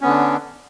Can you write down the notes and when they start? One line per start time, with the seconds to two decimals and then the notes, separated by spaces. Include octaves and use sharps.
0.01 C#4
0.03 B3
0.06 D3
0.08 D4